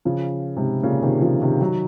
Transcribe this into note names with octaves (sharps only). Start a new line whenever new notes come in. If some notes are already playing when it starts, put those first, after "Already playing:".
C#3 F3
G#2 C3
A#2 C#3
C3 D#3
C#3 F3
C3 D#3
D#3 F#3